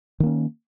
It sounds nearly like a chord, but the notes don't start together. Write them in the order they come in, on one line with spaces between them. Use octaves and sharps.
D#3 A#3 C#4